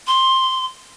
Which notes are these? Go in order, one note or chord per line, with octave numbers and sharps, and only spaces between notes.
C6